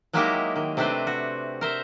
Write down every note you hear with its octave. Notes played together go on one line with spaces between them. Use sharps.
F#3 G#3 A#3 D#4 E4 G4
D#3
C3 A3 C4 D4 B4 C5
F#4
A#4 C5 E5